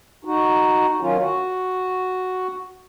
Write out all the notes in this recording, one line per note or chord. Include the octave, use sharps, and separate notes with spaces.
D#4 F#4
D#3 F#3 C#4 F4
F#4